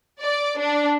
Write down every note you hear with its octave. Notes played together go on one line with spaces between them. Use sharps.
D5
D4